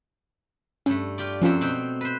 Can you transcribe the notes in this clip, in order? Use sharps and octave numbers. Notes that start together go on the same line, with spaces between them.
G2 A3 C#4
F4 G4 D5
F#2 F3 A3 C4 C#4 F4
B2 C4 G5
B4 C5